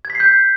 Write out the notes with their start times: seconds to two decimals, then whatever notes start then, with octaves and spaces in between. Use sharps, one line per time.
0.05 G#6
0.10 B6
0.15 C7
0.20 G6